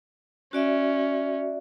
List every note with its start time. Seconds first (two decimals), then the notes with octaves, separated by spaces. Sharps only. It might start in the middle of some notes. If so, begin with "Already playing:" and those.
0.53 C#4 F#4 D5 E5